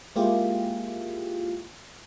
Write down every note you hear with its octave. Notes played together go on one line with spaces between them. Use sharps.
G#3 A#3 E4 F4 G4 G#4